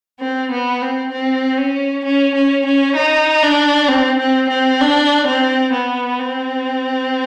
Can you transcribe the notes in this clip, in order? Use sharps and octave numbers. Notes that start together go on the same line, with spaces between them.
C4
B3
C4
C4
C#4
C#4
C#4
C#4
D#4
D4
C4
C4
C4
D4
C4
B3
C4